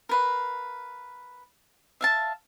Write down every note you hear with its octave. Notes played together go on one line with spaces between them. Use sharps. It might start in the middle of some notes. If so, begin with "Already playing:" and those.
A#4 B4 F5
E5 F5 A5